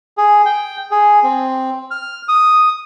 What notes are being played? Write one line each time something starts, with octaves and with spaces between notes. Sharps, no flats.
G#4
G5
G#4
C4
F6
D#6